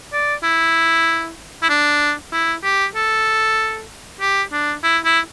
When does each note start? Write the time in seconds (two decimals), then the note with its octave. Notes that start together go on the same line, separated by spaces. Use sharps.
0.13 D5
0.43 E4
1.63 E4
1.69 D4
2.32 E4
2.64 G4
2.95 A4
4.21 G4
4.52 D4
4.83 E4
5.05 E4